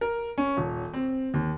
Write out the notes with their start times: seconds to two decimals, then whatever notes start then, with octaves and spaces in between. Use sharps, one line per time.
0.01 A#4
0.38 C#4
0.57 D#1
0.94 C4
1.34 D#2